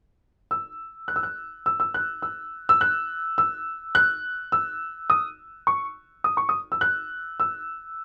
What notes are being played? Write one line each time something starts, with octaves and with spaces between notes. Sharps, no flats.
E6
F#6
E6
F#6
E6
E6
F#6
E6
E6
F#6
E6
F#6
E6
D#6
C#6
D#6
C#6
D#6
E6
F#6
E6